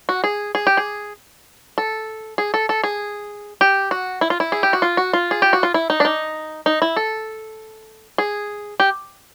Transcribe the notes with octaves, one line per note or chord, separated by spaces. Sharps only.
F#4
G#4
G#4
G4
G#4
A4
G#4
A4
A4
G#4
G4
F#4
E4
F4
E4
G#4
G4
F#4
F4
F#4
F4
G#4
G4
F#4
F4
E4
D#4
D4
D#4
D#4
E4
A4
G#4
G4